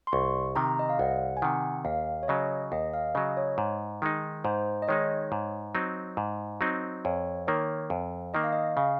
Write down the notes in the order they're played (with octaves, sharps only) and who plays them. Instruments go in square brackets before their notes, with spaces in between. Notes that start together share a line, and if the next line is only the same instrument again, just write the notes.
[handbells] C6
[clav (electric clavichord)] C2 [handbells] C#6
[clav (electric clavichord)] C3 D#3 [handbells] A#5
[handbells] D#5
F5
[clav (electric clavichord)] C2 [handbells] F#5
[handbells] G#5
[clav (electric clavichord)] C3 D#3 [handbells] F#5
[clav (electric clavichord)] D#2 [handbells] F5
[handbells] C#5
[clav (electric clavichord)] C#3 F#3 [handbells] D#5
[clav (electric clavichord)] D#2 [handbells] D#5
[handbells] F5
[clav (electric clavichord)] C#3 F#3 [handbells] D#5
[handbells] C#5
[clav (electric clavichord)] G#2
D#3 G#3 D#4
[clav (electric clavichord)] G#2 [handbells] C5
[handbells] D#5
[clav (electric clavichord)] D#3 G#3 D#4 [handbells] C#5
[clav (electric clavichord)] G#2
F#3 C4 D#4
G#2
F#3 C4 D#4
[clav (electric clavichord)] F2 [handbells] C#5
[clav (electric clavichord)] D#3 A#3 [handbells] C#5
[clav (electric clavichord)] F2
[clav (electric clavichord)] D#3 A#3 [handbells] D#5
[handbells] F5
D#5
[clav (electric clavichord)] C#3 [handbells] F5